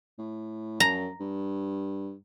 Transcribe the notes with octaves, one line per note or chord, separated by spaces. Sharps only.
A2
F#2 A#5
G2